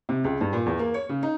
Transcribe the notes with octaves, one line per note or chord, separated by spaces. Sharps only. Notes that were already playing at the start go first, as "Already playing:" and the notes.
C3
C#2
G2
A#2
E2
A#3
C#5
C#3
D#4